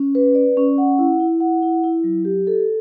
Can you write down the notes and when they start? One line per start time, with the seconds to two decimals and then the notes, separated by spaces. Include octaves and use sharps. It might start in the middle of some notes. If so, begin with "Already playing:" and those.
Already playing: C#4
0.15 B4
0.35 D5
0.57 C#4
0.78 F#5
0.99 E4
1.20 E4
1.40 F#5
1.62 E4
1.84 E4
2.04 F#3
2.25 G4
2.47 A4